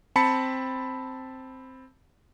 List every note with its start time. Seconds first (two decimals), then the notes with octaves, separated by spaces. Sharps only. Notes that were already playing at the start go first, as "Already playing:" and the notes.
0.16 C4 A5 B5 C#7